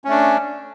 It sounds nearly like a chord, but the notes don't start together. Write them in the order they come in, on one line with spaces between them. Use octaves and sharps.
C#4 A3 D4